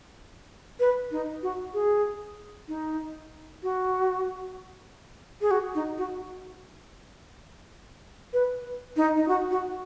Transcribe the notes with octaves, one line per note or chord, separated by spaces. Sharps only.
B4
D#4
F#4
G#4
D#4
F#4
G#4
F#4
D#4
F#4
B4
D#4
D#4
F#4
F#4